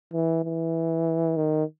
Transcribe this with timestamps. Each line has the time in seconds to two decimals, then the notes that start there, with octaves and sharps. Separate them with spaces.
0.13 E3
0.44 E3
1.36 D#3